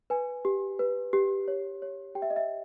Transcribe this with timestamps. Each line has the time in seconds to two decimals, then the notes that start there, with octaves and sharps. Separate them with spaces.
0.10 B4 G#5
0.45 G4
0.79 B4
1.13 G4
1.48 C#5
1.82 C#5
2.15 G4 G5
2.22 E5
2.30 D#5
2.36 E5